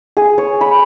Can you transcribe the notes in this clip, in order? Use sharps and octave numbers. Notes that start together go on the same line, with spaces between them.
G#4
C#5
B5